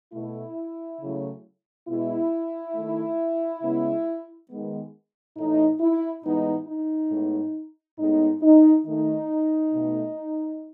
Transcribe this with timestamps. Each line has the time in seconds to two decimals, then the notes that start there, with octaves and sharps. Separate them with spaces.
0.13 B2 A3 E4
1.01 C#3 F#3 A3
1.88 B2 G#3 B3 E4
2.75 D#3 A3
3.63 C#3 G#3 B3
4.50 D#3 G#3 B3
5.37 A2 E3 A3 D#4
5.80 E4
6.24 A2 E3 G#3 B3 D#4
6.67 D#4
7.11 A2 G#3 B3
7.99 A2 G#3 B3 D#4
8.42 D#4
8.86 D#3 A3 D#4
9.73 B2 A3